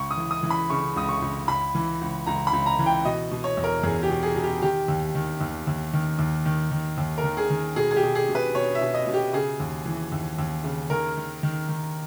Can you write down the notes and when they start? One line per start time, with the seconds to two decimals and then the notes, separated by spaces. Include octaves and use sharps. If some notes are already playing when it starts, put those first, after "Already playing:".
Already playing: C#2 C#6
0.11 D#6
0.17 E3
0.31 D#6
0.43 E3
0.50 B5
0.70 C#3 C#6
0.96 C#2 D#6
1.09 C#6
1.22 C#2
1.48 C#2 B5
1.75 E3
2.01 C#2
2.26 C#2 A#5
2.47 B5
2.53 C#2
2.66 A#5
2.79 E3
2.86 G5
3.05 B2 D#5
3.31 B2
3.44 C#5
3.57 E2
3.64 A#4
3.83 E2 G#4
4.03 G4
4.10 B2
4.23 G#4
4.36 B2
4.43 G4
4.62 D#3 G4
4.88 D#2
5.15 D#3
5.41 D#2
5.67 D#2
5.93 D#3
6.19 D#2
6.46 D#3
6.71 D#3
6.98 D#2
7.18 A#4
7.24 D#3
7.37 G#4
7.50 D#3
7.76 B2 G#4
7.91 G#4
7.96 G4
8.03 B2
8.15 G#4
8.29 B2
8.35 B4
8.55 B2 C#5
8.75 E5
8.81 B2
8.94 D#5
9.07 B2
9.14 G4
9.33 C#3 G#4
9.60 D#2
9.85 E3
10.12 D#2
10.39 D#2
10.64 C#3
10.90 D#3 A#4
11.17 D#3
11.43 D#3
11.69 D#3